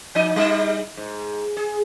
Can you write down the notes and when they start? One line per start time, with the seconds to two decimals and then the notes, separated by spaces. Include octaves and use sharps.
0.15 F3 D#4 D#5
0.36 G3 D#4
0.97 G#2
1.57 G#4